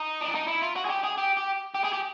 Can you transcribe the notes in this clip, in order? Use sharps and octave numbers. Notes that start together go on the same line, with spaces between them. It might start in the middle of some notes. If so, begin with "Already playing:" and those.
Already playing: D#4
D4
D#4
E4
F4
F#4
G#4
G4
G#4
G4
G4
G4
G#4
G4